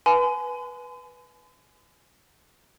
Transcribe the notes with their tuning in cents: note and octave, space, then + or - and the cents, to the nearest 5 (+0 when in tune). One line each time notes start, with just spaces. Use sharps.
B4 -10 G#5 +30 C6 -45